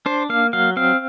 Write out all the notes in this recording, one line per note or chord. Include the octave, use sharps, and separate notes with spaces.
D4 C5
A#3 F5
F#3 F5
C4 F5